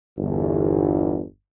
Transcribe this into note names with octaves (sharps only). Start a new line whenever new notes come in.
G1 E2